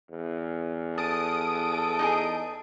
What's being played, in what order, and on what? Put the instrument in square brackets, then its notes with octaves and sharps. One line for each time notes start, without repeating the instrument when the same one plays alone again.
[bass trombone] E2
[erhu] A4 [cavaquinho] A5 [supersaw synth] D#6 D7
[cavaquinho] D#4 G4 G#4